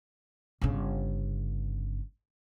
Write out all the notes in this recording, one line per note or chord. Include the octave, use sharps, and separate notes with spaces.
G1 C#3